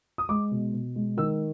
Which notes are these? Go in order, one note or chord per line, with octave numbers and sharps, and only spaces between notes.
D#6
G#3 D6
B2
B2
G#3
D#3 E6